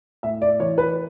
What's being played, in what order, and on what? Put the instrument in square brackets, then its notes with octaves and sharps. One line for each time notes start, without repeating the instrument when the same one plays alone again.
[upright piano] A2 E5
D5
E3 C#5
B4